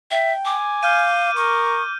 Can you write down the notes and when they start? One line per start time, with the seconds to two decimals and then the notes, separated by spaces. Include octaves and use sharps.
0.11 E5 G5
0.45 G#5 D6
0.83 F5 F6 G6 D#7
1.36 A#4 C#6 D#7